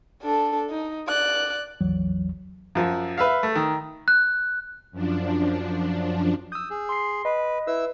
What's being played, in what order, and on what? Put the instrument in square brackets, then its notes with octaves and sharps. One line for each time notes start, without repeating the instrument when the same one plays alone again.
[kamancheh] D4 A4
D#4
D5 F#6
[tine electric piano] A1 E2 E3 F#3
[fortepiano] F#2 F3
B4 E5 F5
A3
D#3
[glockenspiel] F#6
[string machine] F#2 F3 D4
[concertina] D#6 [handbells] E6 G6
[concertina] G#4
[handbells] C6 C7
[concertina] B4 [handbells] D#5
[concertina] E4 E6 [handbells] B4